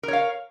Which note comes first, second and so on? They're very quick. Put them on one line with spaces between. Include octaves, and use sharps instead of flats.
A#4 C#5 F5